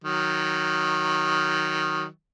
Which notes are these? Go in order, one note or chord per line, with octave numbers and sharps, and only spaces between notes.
D#3 F#3